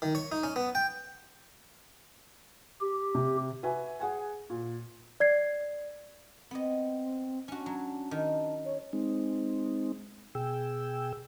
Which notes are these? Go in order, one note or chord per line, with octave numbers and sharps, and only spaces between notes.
D#3
C#5
D#4
C#4
B3
G5
G4
C3
F#4 B4 E5 G#5
G#4 F#5 G#5
A#2
D5 G#6 C7
B3 C4 D#5
C#4 D4 F#4
F#3
D#3
C#5
G#3 C4 D#4
B2 G#4 G5 E6